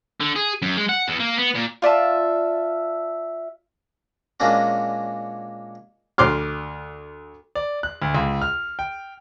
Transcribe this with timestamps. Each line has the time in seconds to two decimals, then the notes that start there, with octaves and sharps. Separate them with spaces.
0.21 D3
0.36 G#4
0.62 F#2
0.77 G#3
0.89 F#5
1.08 E2
1.20 A#3
1.38 B3
1.55 A#2
1.82 F4 D5 E5 A5
4.40 A#2 G#3 A#3 C#4 D4 F#4
6.18 D2 C6 D6 F6
7.55 D5
7.83 F#6
8.02 D2
8.15 C#2
8.42 F6
8.79 G5